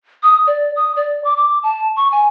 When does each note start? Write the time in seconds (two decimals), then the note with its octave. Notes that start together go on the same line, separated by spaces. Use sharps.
0.23 D#6
0.47 D5
0.76 D#6
0.96 D5
1.25 D6
1.37 D6
1.63 A5
1.97 C#6
2.12 G#5